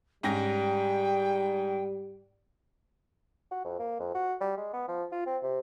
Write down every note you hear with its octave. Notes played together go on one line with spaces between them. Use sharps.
G#2 G3 C#4 G5 A#6
F#4
F2
A#3
F2
F#4
G3
G#3
B3
F3
F4
C4
C3